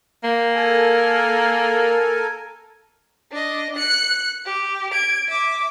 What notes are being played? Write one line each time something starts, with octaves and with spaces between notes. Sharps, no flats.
A#3 G5
A4 A#4 G#5
D4 D#5
F#6 C#7
G4
G#6 D7
E5 D6